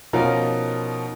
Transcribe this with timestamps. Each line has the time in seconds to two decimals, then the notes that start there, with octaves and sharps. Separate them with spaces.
0.13 B2 F3 C#4 D#4 F4 A#4